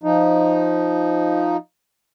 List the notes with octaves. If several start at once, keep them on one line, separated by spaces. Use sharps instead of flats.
F3 D#4